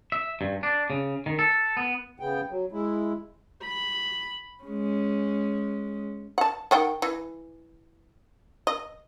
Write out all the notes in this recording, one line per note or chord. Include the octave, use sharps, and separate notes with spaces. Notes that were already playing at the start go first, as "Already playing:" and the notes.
E5
G2
D4
C#3
D#3
A4
B3
C#3 B3 G5
F#3
G#3 E4
B5
G#3 C#4
F#5 A5
D#3 F#5 G5
E3
D#5